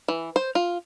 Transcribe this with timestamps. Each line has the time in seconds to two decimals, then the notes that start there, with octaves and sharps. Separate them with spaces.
0.08 E3
0.36 C5
0.55 F4